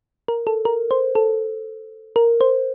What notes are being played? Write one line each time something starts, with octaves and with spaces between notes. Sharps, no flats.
A#4
A4
A#4
C5
A4
A#4
C5